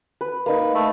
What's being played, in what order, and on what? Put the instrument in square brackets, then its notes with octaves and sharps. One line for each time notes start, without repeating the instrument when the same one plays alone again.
[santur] B4
[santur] A#3 D#4 [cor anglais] B4
[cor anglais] A3 [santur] B5